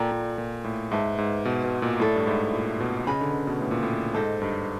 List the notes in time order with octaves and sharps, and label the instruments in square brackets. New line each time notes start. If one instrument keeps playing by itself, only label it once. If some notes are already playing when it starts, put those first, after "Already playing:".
Already playing: [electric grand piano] A#2 [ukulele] A4 D5 G5 A#5
[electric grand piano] A#2
A#2
A2
[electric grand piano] G#2 [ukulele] B4 E5 A5
[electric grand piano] G#2
B2
B2
A#2
[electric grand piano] A2 [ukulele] E4 A4 D5
[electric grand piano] G2
G#2
A#2
B2
[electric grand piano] C#3 [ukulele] B4 D#5 G#5 B5
[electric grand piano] D3
C#3
B2
A2
A#2
A2
[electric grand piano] G#2 [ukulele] A4 C5 D#5
[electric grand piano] G2